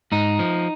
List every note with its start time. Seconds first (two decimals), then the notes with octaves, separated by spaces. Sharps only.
0.12 G#2 D#4
0.39 F3